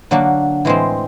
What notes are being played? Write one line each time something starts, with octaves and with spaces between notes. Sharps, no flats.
D3 F#3 A#3 D4 F#4
A2 E3 G#3 C4